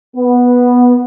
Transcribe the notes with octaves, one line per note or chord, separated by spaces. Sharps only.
B3